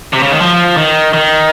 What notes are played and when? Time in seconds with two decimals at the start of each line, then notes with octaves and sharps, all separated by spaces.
0.13 C3
0.23 C#3
0.32 D#3
0.41 F3
0.77 D#3
1.14 D#3